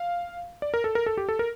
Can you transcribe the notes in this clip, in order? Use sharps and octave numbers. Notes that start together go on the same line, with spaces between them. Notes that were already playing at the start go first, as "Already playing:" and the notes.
Already playing: F5
D5
A#4
A4
A#4
A4
G4
A4
A#4